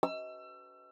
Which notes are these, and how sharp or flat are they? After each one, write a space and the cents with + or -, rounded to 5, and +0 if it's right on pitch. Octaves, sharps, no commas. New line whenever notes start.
E6 +30